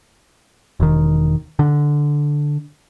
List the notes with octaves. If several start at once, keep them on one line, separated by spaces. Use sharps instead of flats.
E1 D#3
D3